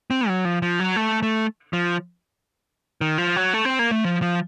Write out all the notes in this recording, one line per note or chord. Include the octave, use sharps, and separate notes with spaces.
C4
F#3
F3
F3
F#3
A3
A3
F3
D#3
F3
F#3
A3
C4
A#3
A3
F3
F3